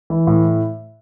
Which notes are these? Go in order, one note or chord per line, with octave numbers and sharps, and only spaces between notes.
E3
A2